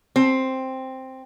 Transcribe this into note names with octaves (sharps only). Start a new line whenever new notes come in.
C4